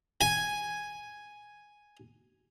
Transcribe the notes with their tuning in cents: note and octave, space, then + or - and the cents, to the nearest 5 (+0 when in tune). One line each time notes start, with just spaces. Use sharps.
G#5 +0